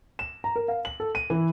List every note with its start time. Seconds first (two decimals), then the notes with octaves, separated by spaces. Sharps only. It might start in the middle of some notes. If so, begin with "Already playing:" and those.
0.19 E7
0.44 A#5
0.56 A#4
0.68 F5
0.85 F#7
1.00 A4
1.15 D#7
1.30 E3